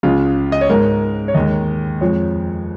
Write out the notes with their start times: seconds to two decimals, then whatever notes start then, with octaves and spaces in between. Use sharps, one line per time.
0.03 C#2 C#3 G#3 F4
0.52 D#5
0.61 C#5
0.69 G#2 G#3 A#4
1.28 C#5
1.35 D#2 D#3 G#3 D#5
2.01 F2 F3 G#3 C#5